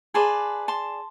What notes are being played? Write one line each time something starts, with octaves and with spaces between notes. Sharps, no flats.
G#4 B4 D5 A5 C6
A5 C6